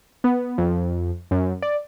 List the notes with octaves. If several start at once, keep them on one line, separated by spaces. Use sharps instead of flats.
B3
F2
F#2
D5